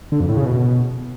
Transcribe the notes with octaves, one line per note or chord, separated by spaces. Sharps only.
D3
F2
A2
C#3
B2